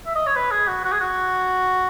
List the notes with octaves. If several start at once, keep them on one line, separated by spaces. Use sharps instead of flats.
E5
D#5
C#5
B4
G#4
F#4
F#4
G#4
F#4